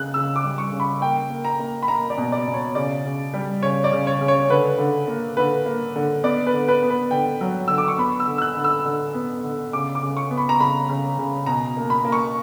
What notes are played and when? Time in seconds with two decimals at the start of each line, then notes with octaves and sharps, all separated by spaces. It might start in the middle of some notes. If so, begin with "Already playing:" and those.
Already playing: C#3 F#6
0.14 C#3 E6
0.36 D6
0.44 G3
0.58 C#6
0.72 C#3
0.80 B5
1.01 A#3 G5
1.30 A#3
1.45 A#5
1.59 A#3
1.83 B5
1.88 A#3 A#5
2.10 D5
2.18 B2
2.32 D5
2.47 B2
2.54 C#5
2.75 C#3 D5
3.05 C#3
3.34 G3
3.62 C#3 C#5
3.84 D5
3.92 C#3
4.07 C#5
4.21 C#3
4.28 C#5
4.49 D3 B4
4.78 D3
5.07 A#3
5.37 D3 B4
5.66 A#3
5.96 D3
6.24 B3 D5
6.47 B4
6.54 D3
6.68 B4
6.83 B3
6.90 B4
7.11 D3 G5
7.41 F#3
7.68 D3 E6
7.78 D6
7.88 C#6
7.98 B3 B5
8.20 E6
8.28 D3
8.38 E6
8.42 F#6
8.56 D3
8.64 E6
8.85 D3
9.14 B3
9.44 D3
9.73 C#3 D6
9.95 D6
10.02 C#3
10.17 C#6
10.31 B3
10.38 B5
10.49 A#5
10.59 C#3 B5
10.89 C#3
11.18 C#3
11.46 B2 A#5
11.77 A#3
11.90 B5
12.05 A#3
12.12 C#6